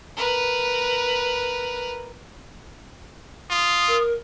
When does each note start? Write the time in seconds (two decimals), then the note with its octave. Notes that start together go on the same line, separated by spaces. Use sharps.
0.17 A#4 B4
3.50 F4 D#6
3.88 A#4